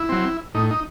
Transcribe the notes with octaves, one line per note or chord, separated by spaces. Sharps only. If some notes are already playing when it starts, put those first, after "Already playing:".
Already playing: E4
F#3 C4
A2 D#4
D#4